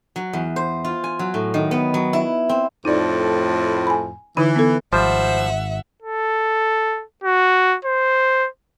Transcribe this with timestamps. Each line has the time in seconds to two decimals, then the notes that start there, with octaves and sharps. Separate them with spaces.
0.16 F#3
0.33 E2
0.56 C5
0.84 F4
1.04 G#5
1.19 F#3
1.34 A2
1.54 D#3
1.71 B3
1.94 F#3
2.13 E4
2.49 C4
2.85 F2 A2 D#4 D5
3.87 G#5 B5
4.37 D3 E3 D#4 B5
4.56 B3 A4
4.93 G#1 F3 G3 C5 E5 F#5
6.02 A4
7.24 F#4
7.85 C5